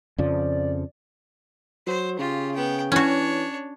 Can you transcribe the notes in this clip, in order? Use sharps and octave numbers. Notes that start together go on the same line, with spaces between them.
F2 C#3 F3 D5
F#3 C5
C#3 F4 G4
B3 G5
E3 C#4 D4 F#4 C#5